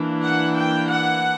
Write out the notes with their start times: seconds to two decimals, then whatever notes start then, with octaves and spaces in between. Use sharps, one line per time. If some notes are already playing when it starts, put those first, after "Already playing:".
Already playing: E3 A#3 D4
0.25 F#5
0.57 G5
0.89 F#5